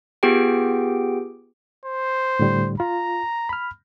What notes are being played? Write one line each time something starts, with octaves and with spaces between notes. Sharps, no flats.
B3 F4 G4 G#4 G5
C5
A2 D3 G3
F4 A#5
B5 F6